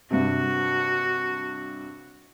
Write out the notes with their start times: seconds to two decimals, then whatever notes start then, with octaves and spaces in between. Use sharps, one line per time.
0.11 G2 C3 F#4